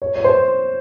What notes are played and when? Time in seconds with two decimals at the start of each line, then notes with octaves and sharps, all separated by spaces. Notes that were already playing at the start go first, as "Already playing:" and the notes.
0.02 C#5
0.16 C#5
0.24 C5